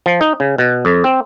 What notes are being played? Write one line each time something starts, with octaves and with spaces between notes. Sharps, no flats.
F3
D#4
C#3
B2
F2
C4